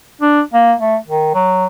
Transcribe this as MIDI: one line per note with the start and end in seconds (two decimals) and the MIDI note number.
0.21 0.41 62
0.53 0.74 58
0.80 0.97 57
1.07 1.29 51
1.34 1.66 54